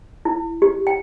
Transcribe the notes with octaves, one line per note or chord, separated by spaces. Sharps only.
E4
G4
G5